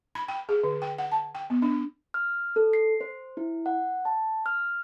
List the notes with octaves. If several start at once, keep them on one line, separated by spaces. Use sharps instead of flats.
B5
G5
G#4
D3
G5
F#5
A5
G5
B3
D4
F6
A4
C7
C5
E4
F#5
A5
F6